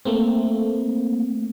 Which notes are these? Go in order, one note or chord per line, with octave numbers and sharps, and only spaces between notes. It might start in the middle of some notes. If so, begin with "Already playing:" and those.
A3 A#3 C4